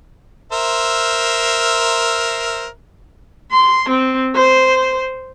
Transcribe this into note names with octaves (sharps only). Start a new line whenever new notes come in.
A#4 C5 E5
C6
C4
C5